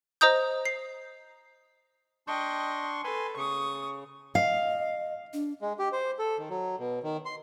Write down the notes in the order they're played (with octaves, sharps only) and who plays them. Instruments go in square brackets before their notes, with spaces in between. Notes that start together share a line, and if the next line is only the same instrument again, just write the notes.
[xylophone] C5 D#5 A#5 D#6 G6
C7
[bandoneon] D4 C6 C#6 [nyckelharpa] D#5 G5
[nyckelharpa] A4 B4 [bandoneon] G#5 C6
[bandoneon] C#3 [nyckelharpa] C#6 D#6
[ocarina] D#5 [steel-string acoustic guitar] F5
[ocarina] D4
[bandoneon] G#3
G4
C5
A4
D#3
F#3
B2
D#3
C6